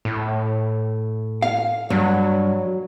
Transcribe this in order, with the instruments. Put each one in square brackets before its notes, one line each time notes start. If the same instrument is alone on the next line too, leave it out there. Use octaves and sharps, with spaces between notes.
[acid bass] A2
[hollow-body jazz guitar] F5
[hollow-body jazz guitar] G2 [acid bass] F#3